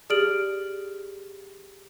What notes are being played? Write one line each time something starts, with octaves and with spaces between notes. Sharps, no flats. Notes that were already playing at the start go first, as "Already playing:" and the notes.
G4 G#4 D5 F6 D7 F#7